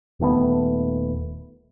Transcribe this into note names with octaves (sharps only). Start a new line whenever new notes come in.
D#1 D#3 A3 B3